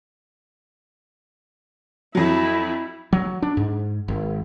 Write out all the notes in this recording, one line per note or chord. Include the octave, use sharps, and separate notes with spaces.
F2 F#3 E4
F#3
D4
G#2
G#1